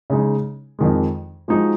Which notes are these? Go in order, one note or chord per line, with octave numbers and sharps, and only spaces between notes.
C#3 G#3 D#4
F2 D#3 G#3
F3 G#3 D#4 F#4